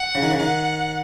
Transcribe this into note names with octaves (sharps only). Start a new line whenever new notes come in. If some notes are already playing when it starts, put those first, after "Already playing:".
Already playing: F#5
C#3
D#3
C#3
D#3 F#5